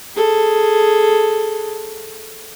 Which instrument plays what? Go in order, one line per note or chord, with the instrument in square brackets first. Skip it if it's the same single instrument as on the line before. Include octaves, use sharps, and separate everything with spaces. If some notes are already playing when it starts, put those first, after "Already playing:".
[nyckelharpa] G#4 A4